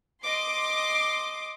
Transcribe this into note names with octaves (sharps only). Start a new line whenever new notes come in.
D#5 C6 D6